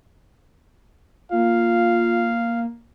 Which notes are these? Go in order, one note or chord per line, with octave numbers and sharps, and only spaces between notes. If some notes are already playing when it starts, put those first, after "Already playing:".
A#3 F4 F5